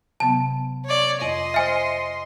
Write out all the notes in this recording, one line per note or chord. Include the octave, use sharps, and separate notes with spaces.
C3 F#3 B3 A5
C#5 D5
F2 D#5 C6
C5 E5 G#5 F6